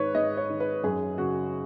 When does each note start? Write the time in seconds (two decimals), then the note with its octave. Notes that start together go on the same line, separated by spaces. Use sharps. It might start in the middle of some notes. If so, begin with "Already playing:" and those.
Already playing: G#2 D#3 B4 C#5
0.14 G#2 D#5
0.37 C#5
0.50 D#3
0.60 B4
0.83 F#2 G#4
1.18 C#3 F#4